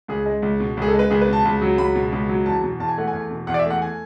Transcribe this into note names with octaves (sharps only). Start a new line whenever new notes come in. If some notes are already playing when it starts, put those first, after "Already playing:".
C#2 G#4
G#3
C#2
B2
C#2 G#4
A4
G#3
B4
C#2 G#4
B4
B2 A5
C#2
F#3
C#2 B5
B2
C#2
F#3
E2 A5
B2
E2 A5
G#5
A3 F#5
G#5
E2
B2
E2 F#5
D5
E5
A3
F#5
G#5